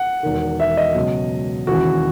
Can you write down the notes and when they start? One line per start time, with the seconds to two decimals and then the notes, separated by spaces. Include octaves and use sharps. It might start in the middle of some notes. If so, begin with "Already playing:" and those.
Already playing: F#5
0.23 E1 E2 D#3
0.60 E5
0.77 D#5
0.95 C#2 B2 F#3
1.67 E1 D#2 C#3 E3 F#4